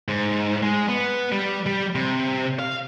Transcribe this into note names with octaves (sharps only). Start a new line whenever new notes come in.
G#2
G#3
B3
G3
G3
C3
F5